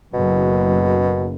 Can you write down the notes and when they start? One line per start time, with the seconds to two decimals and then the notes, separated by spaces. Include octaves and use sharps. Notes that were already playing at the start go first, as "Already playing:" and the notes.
0.14 F#1 F#2 B2